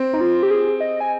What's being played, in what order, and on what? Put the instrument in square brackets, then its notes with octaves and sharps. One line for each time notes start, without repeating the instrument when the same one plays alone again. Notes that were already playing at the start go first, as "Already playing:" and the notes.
Already playing: [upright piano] C4
[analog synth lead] D#4
F4
G4
G#4
D#5
G#5